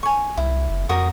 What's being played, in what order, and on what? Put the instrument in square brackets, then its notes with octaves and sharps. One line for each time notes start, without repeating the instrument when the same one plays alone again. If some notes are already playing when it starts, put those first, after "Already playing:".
[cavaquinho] G#5 C#6
[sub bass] C2 [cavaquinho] E4
[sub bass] F#1
[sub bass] F2 [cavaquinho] F#4 A#4 D#6